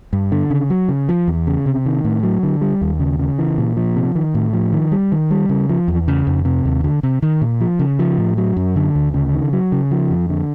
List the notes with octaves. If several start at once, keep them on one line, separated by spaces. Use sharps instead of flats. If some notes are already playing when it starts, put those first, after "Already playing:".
G2
D3
C#3
F#3
C#3
F3
E2
C#3
C3
D#3
A2
F#3
D3
G3
D#2
C#3
C#3
E3
A#2
F3
C3
D#3
A2
F3
D#3
G3
D#3
G3
C#3
F3
E2
C#3
F2
C3
D#2
D3
C3
D#3
A#2
F3
C#3
F3
A2
F#3
F#2
D3
D2
C#3
D#3
F#3
C#3
F3
F2
D3